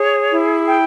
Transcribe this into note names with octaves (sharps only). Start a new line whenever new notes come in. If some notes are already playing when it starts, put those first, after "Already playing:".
Already playing: G#4 C#5
E4
G5